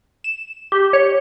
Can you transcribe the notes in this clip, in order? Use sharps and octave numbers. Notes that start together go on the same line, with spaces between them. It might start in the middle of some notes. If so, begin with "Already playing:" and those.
E7
G4
C#5